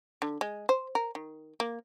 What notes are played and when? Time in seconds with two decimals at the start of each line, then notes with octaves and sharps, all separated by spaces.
0.22 D3
0.41 G#3
0.69 C5
0.95 A#4
1.15 D#3
1.60 A#3